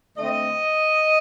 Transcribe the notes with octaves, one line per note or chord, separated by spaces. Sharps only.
D3 A3 C4 D#5